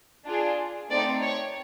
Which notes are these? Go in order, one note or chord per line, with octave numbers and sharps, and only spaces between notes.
D4 F4 G#4
A3 C4 D#4 D5
C#5